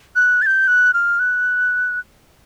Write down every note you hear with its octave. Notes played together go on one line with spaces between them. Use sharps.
F#6
A6
G6
F#6
F6
F#6